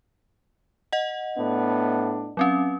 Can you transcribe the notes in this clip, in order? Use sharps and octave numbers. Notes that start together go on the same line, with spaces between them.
D#5 F#5
A2 B3 D4
F#3 C4 C#4